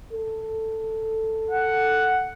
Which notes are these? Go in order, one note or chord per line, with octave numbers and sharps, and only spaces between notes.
A4
F#5